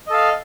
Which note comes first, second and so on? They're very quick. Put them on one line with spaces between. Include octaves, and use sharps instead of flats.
D#5 A4 F5